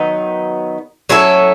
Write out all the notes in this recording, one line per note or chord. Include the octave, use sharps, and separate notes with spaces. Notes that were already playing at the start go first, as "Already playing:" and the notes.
Already playing: D#3 F#3 B3 D#4
F#3 C#4 E4 A4